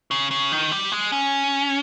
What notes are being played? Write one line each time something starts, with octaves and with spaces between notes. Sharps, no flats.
C#3
C#3
D#3
G3
G#3
C#4